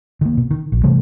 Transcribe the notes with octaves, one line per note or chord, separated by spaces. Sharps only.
D#3 A#3
B2
D#3
A#1
C3 E3 G3 A3